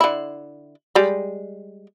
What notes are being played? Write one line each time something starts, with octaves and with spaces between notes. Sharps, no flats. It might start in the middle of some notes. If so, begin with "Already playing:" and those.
D3 E4
G3 G#3